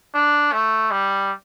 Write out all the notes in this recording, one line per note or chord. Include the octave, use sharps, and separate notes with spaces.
D4
A3
G3